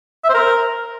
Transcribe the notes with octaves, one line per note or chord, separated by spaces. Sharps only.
E5
C5
A#4